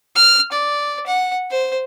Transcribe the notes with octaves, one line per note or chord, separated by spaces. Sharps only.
F6
D5
F#5
C5